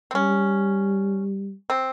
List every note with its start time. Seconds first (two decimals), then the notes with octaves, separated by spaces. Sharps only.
0.11 C4
0.15 G3 C#4
1.70 C4